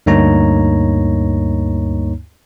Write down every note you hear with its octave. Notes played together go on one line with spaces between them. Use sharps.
D2 G2 A#3 D#4 C#5 A#5